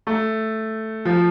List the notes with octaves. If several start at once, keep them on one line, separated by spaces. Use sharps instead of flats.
A3
F3